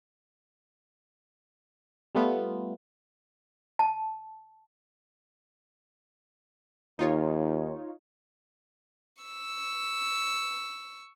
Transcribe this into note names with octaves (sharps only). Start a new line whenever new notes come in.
G3 A3 B3 F4
A5
D#2 D#4 F4 C#5
C#6 E6